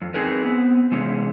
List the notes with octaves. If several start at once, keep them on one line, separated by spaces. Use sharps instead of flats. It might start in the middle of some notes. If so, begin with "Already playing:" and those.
F2
C4 D#4 G#4 A#4 B4
B3 C4
C3 E3 G#3 C#4